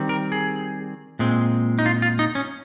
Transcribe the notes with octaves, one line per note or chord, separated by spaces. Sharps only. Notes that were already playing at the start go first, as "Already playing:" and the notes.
Already playing: D#3 G3 C4
A#4
G#4
A#2 G#3 C4
D#4
F4
F4
D#4
C#4